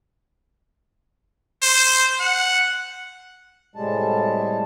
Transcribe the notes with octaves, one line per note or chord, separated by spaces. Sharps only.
C5
F#5
A2 C3 G3 G#3 A5